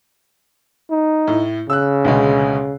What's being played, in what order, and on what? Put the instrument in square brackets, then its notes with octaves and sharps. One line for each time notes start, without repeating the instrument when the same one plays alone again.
[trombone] D#4
[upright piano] A2
[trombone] C#3 [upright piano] E6 F#6
[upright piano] D2 B2 G#3